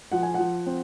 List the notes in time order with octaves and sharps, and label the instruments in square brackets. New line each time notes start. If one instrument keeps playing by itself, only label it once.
[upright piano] F3 F#5
G#5
F3 F#5
C4